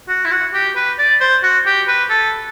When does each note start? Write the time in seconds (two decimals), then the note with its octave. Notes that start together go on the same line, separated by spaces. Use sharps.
0.09 F#4
0.25 E4
0.31 F#4
0.54 G4
0.76 B4
0.98 D5
1.20 C5
1.43 F#4
1.66 G4
1.88 B4
2.10 A4